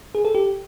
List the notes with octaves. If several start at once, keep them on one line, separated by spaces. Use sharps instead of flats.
G#4
A4
G4